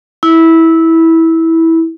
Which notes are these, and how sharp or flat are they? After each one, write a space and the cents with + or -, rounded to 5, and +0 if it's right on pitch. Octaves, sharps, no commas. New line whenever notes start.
E4 -15